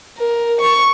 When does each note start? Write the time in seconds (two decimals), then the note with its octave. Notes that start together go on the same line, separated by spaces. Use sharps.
0.18 A#4
0.61 C#6